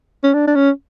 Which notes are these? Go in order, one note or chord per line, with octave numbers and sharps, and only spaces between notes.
C#4
D4
D4
C#4